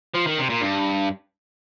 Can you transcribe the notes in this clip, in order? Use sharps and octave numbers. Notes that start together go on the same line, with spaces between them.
F3
D#3
C3
A#2
G2